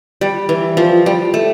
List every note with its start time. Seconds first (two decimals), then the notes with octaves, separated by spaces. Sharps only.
0.21 G3
0.49 E3
0.77 F3
1.06 G3
1.34 A3